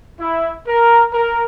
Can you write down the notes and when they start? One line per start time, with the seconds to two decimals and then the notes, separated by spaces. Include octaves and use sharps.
0.19 E4
0.67 A#4
1.12 A#4